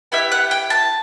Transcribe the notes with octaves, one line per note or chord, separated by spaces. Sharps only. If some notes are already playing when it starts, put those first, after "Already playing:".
B3 E4 G4 E5
F#5
G5
A5